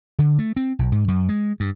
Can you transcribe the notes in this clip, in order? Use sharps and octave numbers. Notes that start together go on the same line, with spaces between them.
D3
A3
C4
B1
G#2
F#2
G#3
G2